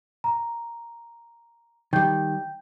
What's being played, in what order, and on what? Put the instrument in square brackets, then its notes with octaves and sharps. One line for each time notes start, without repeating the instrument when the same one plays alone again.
[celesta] A#5
[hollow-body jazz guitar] D#3 G3 [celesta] G5 G6